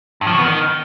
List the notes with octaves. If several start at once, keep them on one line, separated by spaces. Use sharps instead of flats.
G2
F3
C#3
B3
D#3